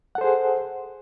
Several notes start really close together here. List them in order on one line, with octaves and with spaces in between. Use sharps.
F#5 A4 C5 G#4